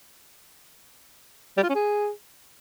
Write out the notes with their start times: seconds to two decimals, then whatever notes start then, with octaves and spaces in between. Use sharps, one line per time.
1.57 G3
1.63 F4
1.69 C#4
1.75 G#4